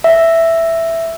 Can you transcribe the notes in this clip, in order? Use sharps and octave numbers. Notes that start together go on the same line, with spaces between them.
E5